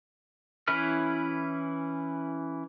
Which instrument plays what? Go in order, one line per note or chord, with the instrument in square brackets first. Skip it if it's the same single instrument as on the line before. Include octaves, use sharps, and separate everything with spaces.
[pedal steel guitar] E3 C#4 E4 B4 F6